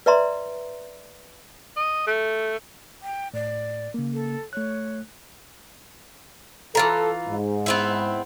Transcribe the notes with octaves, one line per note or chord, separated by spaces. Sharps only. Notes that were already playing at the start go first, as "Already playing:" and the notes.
B4 D5 E5 A#5 C6
D#5
A3
G5
A2 D5
C#3 A#3
A4
A3 C#5 F#6
E3 F4 A4 A#5
G#2
B3 C4 E4